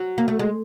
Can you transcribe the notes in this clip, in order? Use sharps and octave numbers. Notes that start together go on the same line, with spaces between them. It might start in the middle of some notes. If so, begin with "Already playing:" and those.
Already playing: F#3
A#3
A3
G#3